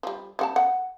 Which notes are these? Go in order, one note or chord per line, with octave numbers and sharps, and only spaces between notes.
F3 G3
G3 F#5 A5
F#5